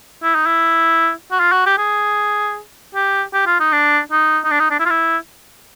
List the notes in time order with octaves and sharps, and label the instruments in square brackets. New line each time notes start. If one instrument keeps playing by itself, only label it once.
[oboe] E4
D#4
E4
F#4
F4
F#4
G4
G#4
G4
G4
F4
D#4
D4
D#4
D#4
D4
D#4
D4
E4
F4
E4